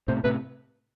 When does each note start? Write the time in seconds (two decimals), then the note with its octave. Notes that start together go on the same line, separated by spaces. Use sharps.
0.08 A2 C3 C5
0.24 A2 C3 B4